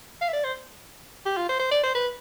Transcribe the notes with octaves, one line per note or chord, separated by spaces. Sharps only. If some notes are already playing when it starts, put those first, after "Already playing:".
F5
E5
D5
C5
G4
F4
C5
C5
D5
C5
B4